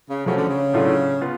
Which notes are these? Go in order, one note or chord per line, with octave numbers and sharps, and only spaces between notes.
C#3
C#3 F3 A3 C#4 F#4
D3
C#3
A2 F#3 A3 D4 F4
B3 F4